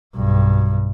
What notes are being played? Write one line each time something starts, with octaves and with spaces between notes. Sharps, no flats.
B1 G2